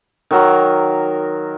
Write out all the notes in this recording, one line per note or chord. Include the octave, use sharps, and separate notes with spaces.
D#3 F#3 A#4